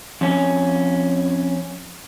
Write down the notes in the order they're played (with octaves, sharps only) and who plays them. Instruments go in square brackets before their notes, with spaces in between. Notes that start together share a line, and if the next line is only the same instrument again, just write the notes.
[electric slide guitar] F2 C#4